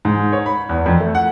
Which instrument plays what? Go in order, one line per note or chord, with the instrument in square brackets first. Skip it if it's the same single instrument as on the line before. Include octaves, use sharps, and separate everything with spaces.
[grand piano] G#2
C#5
B5
E2
F2
A3
F#5